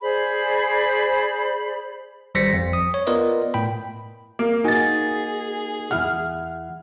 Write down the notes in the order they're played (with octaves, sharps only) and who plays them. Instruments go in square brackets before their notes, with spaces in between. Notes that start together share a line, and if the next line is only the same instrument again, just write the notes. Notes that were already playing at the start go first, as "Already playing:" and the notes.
[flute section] G#4 C5 D5 B5
[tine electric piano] G#1 G3 C5 A#6 B6 C#7
F2
D#6
C#5
B3 F4 A#4 B4 D5 D#5
A2 G5 B5
[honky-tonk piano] A#3
[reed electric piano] A#3 F#4 G#5 [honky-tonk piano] D#4 A6 [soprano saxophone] G#4
[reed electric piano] E2 E4 F#5 [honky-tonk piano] F6